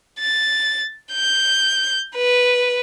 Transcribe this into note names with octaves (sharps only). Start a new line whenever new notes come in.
A6
G6
B4